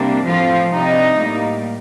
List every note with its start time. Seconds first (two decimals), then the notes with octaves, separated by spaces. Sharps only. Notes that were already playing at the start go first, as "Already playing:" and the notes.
Already playing: C3 G3 A#3 D4
0.25 A2 F3 A3 C4 F4
0.71 C3 G3 D4 D#4
1.17 A2 G3 A#3